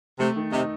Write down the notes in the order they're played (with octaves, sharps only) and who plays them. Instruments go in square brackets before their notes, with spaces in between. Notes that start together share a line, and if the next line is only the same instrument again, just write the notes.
[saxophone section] C3 [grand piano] A3
[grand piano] D#3
[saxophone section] C3 [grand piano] D#4